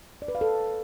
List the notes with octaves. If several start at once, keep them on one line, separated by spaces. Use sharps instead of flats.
D5
B4
F5
A4